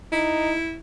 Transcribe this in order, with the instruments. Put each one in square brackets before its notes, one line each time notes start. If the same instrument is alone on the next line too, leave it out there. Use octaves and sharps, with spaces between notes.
[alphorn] D#4 [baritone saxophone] E4